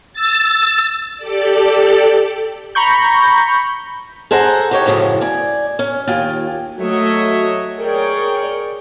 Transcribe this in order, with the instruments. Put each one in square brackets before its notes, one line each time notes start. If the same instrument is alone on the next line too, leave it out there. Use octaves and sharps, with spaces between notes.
[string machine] E6 A6
G4 A4 D5
[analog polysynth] A#5 B5 C#6 G6
[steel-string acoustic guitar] G#4 A4 C5 F#5 A#5
D#4 G4 C#5
F#2 A2 C#3 F3
D5 G#5
C#4
D#2 F4 G5 G#5
[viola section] F#3 A3 C#5 D#5 E5
G#4 A#4 C#5 D5 G5